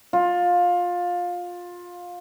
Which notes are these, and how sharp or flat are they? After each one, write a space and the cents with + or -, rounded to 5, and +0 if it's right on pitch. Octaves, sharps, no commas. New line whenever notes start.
F4 +20